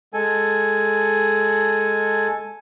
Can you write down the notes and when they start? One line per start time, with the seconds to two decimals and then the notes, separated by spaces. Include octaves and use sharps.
0.14 G#3 A4 G#5